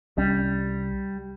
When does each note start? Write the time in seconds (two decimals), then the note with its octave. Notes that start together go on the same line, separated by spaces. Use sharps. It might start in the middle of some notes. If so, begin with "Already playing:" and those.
0.18 C2 G3 C#4